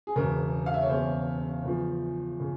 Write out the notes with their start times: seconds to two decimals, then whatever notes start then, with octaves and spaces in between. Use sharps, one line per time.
0.07 G#4
0.16 E1 E2 C#3 A#4
0.66 F5
0.74 E5
0.82 C#5
0.89 E1 E2 C#3 C5
1.63 E2 C#3 F3
2.40 C#3